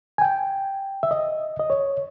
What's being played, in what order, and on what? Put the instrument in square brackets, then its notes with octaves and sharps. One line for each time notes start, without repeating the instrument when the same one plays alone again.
[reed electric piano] G#5
G5
E5
D#5
D#5
C#5